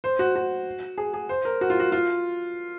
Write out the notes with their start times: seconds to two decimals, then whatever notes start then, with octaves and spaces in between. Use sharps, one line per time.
0.04 C5
0.19 F#4
0.36 F#4
0.98 G#4
1.14 G#4
1.29 C5
1.45 A#4
1.61 F#4
1.70 F4
1.80 F#4
1.92 F4